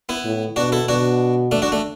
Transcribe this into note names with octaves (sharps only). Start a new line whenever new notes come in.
B3 E4
A2
B2 D4 F#4
E4 A4
B2 D4 F#4
A3 D4
D4 F#4
A3 D4